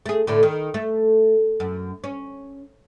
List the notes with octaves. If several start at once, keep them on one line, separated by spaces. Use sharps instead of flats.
A3 G#4
A2 D3 A3
D#3
A3
F#2
C#4